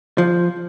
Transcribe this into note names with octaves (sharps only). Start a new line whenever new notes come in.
F3